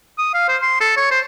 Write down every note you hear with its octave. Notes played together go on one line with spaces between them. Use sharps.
D#6
F5
C5
C6
A4
C#5
C5